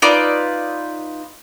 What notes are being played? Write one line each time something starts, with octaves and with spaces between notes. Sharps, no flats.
D#4 F4 B4 D5